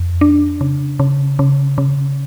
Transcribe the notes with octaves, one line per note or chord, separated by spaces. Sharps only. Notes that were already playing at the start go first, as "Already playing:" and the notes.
Already playing: F2
D4
C#3
C#3
C#3
C#3